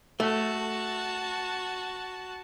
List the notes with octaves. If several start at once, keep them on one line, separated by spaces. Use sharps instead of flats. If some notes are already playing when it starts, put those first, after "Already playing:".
A3 F#4 A5